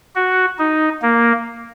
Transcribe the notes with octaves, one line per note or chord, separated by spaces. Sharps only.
F#4
D#4
A#3